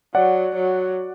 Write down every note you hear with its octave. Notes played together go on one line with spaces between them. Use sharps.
F#3 D5 F#5
F#3